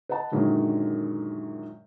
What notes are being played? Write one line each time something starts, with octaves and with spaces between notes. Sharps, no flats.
B4 D#5 F#5 A5
F#2 A#2 D3 D#3 F#3 G#3